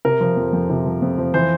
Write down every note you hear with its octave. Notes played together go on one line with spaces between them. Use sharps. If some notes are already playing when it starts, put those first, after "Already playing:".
C3 A#4
F3
F2
F2
C3
F3
F2
F3
E3 C5